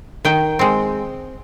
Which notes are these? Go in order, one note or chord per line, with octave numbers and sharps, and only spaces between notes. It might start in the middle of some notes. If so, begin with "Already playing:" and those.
D#3 G5
G#3 C4